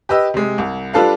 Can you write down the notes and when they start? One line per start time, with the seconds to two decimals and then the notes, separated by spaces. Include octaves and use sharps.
0.09 G4 B4 D#5 E6
0.34 C3 G#3
0.58 C2
0.93 G3 D4 F4 A4 B4 F5